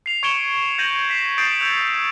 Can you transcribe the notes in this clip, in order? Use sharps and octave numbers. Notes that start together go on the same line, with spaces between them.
C7 F7
C#6 G#6 C#7 D7 E7 G7
G6 G#6 A#6 D#7 F#7
B6 C7 E7
D#6 G6 A6 C7 D7
E6 G6 C#7 F7